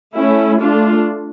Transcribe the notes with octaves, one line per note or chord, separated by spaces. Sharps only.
A3 C#4 E4
A3 D4 F4